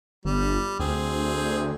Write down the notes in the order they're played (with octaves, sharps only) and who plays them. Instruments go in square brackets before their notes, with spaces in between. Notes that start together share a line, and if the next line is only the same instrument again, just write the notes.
[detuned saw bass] G1 [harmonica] G3
[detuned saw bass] D2 [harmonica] C4 G#4